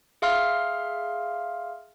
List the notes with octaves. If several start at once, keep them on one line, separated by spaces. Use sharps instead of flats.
G#4 E5 F5 C6 F6